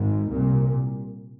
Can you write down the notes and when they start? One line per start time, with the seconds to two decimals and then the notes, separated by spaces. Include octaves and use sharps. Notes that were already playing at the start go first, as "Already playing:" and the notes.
Already playing: G#1 G#2
0.30 C2 A#2